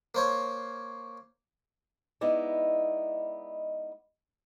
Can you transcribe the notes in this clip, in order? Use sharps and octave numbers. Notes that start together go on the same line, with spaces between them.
A#3 C5 C#5
G#3 B3 D#4 E4 D5